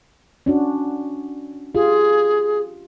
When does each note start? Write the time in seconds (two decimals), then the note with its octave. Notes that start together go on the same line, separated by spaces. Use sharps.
0.46 C#4 D4 F#4
1.75 F4 G4 G#4